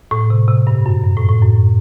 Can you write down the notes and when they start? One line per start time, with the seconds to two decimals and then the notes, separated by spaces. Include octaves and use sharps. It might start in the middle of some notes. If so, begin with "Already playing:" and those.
0.11 A2
0.30 C3
0.48 C3
0.67 G2
0.86 F#2
1.04 G2
1.17 A2
1.29 A2
1.42 F#2